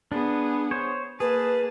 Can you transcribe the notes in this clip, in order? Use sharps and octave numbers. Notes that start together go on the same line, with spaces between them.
B3 D4 G#4
C5 C#5
A#3 G#4 B4 A5